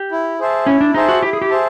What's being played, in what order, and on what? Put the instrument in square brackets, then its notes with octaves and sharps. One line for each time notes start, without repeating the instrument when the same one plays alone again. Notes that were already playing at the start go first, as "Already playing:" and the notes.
Already playing: [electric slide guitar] G4
[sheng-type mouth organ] E4
G#4 C5 E5 A5
[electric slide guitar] C#4 [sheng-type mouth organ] E4
[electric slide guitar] D4
[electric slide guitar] D#4 [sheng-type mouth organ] G#4 C5 E5 A5
[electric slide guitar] F#4
[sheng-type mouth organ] E4 [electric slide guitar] G4
[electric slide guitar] G#4
G4
[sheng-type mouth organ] G#4 C5 E5 A5